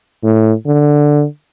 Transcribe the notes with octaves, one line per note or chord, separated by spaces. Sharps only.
A2
D3